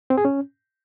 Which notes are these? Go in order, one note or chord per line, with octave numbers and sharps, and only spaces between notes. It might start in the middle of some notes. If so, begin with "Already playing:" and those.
C4
G#4
C#4